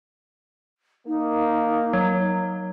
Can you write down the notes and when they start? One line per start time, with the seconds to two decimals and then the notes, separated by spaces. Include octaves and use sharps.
1.07 A#3 D#4
1.93 F#3